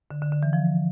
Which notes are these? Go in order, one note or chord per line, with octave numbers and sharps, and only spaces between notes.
D3
D3
D3
E3
F3